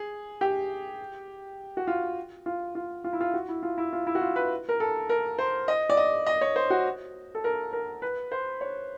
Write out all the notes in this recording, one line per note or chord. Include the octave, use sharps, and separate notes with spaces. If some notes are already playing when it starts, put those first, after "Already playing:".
Already playing: G#4
G4
F#4
F4
F4
F4
F4
E4
F4
F#4
E4
F4
E4
F4
E4
F#4
F4
B4
A#4
A4
A#4
C5
D#5
D5
D#5
D#5
C#5
C5
F#4
A4
A#4
A#4
B4
C5
C#5